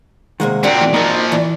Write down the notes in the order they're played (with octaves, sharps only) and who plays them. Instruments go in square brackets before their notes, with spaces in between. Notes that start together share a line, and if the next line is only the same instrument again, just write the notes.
[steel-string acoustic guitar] C3 A#3 F#5 [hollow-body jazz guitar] D#3 G#3
[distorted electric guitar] A#2 C4 [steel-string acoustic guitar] D4 F#4
[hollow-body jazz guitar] A2 E3
[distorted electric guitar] A#2 F3 [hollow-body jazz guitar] D#4 A#4
[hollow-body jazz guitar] E3 [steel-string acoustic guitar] D4